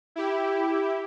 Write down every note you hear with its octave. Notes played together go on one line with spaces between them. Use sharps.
E4 G4